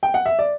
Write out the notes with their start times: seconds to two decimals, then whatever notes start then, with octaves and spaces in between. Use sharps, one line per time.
0.03 G5
0.14 F#5
0.26 E5
0.39 D5